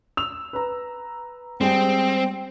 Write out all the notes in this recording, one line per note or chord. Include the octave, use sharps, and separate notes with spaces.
E6 F7
B4 A#5
G3 G#3 C4 G#4 G5